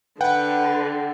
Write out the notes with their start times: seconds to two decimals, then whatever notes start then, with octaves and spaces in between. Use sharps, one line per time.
0.21 D3 B4 F#5 G5